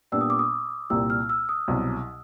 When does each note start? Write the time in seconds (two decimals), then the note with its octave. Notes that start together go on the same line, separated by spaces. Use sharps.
0.12 A#2 G3 B3 D4 E6
0.21 D#6
0.30 D6
0.39 D#6
0.90 C2 A#2 G3 A#3 E6
1.10 F6
1.29 E6
1.49 D#6
1.68 C2 B2 F#3